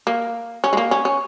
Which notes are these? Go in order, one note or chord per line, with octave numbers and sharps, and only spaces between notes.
A#3
C#4
G#3
A#3
C#4
C#4